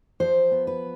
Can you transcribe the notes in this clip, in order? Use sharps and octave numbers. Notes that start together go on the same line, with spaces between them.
F3 C5
B3
B4